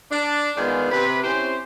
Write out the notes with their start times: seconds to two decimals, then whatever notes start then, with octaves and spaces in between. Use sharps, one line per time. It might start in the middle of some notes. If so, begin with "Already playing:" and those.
0.11 D4
0.57 D#3 G#3 B3 D4 F4 G#4
0.91 C3 B4
1.24 C4 C#4 E4 G4 C5